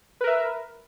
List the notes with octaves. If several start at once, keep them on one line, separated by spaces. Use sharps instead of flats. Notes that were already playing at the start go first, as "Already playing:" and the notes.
A#4 B4 E5